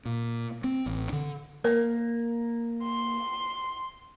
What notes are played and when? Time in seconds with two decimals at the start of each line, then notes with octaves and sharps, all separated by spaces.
0.06 A#2
0.64 C4
0.86 A1
1.13 D3
1.64 A#3 A#4
2.84 C6